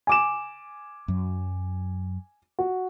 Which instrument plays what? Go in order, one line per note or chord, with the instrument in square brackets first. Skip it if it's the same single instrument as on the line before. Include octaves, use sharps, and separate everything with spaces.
[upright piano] G#5 D6 E7
[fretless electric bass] F#2 F#3
[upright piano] F#4